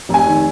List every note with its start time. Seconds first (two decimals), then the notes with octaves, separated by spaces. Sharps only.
0.09 F1 G#5
0.27 D#3